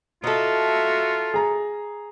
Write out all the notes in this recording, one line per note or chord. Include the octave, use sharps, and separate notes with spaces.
D#4 F4 F#4 A4 E5
G#4 A#5